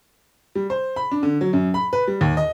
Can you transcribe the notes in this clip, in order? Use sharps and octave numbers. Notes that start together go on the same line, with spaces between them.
G3
C5
B5
D4
D3
F#3
F#2
B5
B4
G3
D#2
D#5